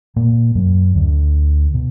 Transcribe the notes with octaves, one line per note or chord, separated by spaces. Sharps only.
A#2 A#3
F#2 F#3
D2 D3
B2